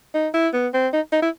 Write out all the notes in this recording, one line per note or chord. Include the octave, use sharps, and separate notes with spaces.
D#4
E4
B3
C4
D#4
D#4
E4